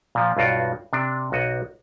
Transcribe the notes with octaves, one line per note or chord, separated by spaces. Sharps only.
A#2 F3
B1 G2 F4 F#4 G5
C3 D4
B1 F#4 D#5